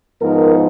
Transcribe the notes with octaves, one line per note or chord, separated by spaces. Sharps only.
G#2 F3 B3 D#4 A#4